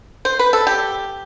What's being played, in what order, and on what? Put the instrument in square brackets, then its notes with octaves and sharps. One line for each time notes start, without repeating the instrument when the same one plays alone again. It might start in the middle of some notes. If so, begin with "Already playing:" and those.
[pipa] C5
B4
A4
G4